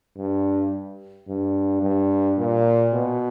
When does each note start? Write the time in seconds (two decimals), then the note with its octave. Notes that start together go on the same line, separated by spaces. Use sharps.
0.17 G2
1.28 G2
1.83 G2
2.38 A#2
2.93 B2